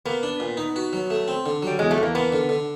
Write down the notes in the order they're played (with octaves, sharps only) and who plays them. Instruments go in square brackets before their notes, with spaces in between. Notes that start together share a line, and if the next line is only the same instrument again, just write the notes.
[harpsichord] A#3 [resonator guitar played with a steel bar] B3
[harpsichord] D4
A#2
D#4
F#4
F#3
A3
C4
D3
[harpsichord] F#3 [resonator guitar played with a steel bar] G3
[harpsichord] E2 [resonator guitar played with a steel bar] G#3
[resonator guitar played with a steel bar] A3
[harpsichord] E2 [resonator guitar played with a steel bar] A#3
[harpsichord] A#3 [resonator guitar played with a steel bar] B3
[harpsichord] D3
D3